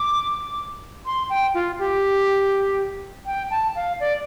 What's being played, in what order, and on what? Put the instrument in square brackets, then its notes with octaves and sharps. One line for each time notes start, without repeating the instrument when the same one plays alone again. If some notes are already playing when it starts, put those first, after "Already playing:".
Already playing: [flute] D6
C6
G5
F4
G4
G5
A5
F5
D5